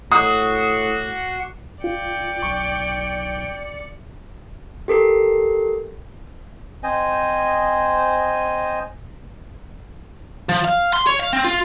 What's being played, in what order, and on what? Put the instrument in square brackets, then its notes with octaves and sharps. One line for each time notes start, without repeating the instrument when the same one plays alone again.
[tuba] A2 [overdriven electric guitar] F#4 [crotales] D6 F#6 C7 [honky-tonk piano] D#6
[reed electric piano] F4 [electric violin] D5 C#7 [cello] G5
[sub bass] B1 [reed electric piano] C#6
[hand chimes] G4 A4 A#4 C7
[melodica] C4 C5 D#5 G#5
[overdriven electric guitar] F3
F5
C6
C#5
F5
C4
F4